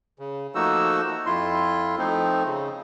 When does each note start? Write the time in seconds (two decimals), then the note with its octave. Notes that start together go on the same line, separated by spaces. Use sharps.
0.19 C#3
0.55 F3 A3 A#3 D#4 F#4 E6
1.26 F2 E4 F4 C6
1.98 F3 A3 C4 D#4
2.46 C#3